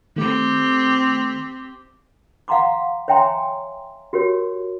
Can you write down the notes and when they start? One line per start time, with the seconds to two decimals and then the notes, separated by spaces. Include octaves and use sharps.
0.16 D#3 A3 C4 G4
2.48 F5 F#5 A#5 C6 D6
3.08 C#5 E5 G5 G#5 A#5 C6
4.13 F#4 G4 A#4 C#5